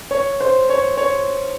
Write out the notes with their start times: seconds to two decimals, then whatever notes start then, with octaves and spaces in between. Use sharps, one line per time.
0.11 C#5
0.40 C5
0.70 C#5
0.97 C#5